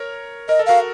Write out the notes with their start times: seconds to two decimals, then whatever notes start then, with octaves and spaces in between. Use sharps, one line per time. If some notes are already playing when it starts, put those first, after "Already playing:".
Already playing: A#4 C#5
0.49 A#4 D#5
0.59 A4
0.66 F#4 A#4 F5